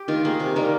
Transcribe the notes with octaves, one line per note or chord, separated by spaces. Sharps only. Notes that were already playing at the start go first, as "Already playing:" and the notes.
Already playing: G4
D#3 F4
A#3 G#4
C3 G4
D#3 G3 A#3